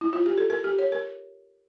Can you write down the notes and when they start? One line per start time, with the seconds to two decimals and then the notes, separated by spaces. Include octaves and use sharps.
0.01 E4
0.13 F4
0.26 G4
0.38 A4
0.50 A#4
0.64 G4
0.79 C#5
0.92 A#4